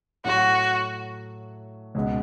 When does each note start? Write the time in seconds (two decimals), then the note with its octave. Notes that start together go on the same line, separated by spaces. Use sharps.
0.25 A2 F#3 A3 F#4
1.95 C#2 B2 G#3 B3